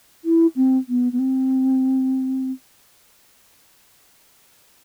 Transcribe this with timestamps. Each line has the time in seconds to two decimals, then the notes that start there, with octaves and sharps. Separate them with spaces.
0.25 E4
0.56 C4
0.89 B3
1.13 B3
1.19 C4